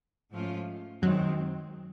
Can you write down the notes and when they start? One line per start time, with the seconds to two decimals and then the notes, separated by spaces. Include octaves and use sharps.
0.32 G#2 F3 A3 C#4 F4
1.02 F#2 D#3 F#3 G#3 C4